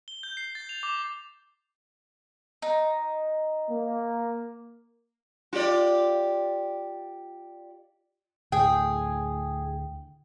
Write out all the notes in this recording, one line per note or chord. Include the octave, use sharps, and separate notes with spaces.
G7
G6
C7
A6
F7
D6
D#4
A#3
F4 G4 D5
D2 A2 G#4 G5